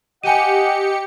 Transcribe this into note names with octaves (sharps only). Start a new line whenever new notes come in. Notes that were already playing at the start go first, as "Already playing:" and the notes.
G4 D#5 F#5 G#5 C#7 D#7